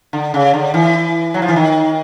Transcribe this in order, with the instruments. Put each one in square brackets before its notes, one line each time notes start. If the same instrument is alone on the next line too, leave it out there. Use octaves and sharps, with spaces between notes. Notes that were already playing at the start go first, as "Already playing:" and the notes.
[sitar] D3
C#3
D3
E3
F#3
F3
E3
D#3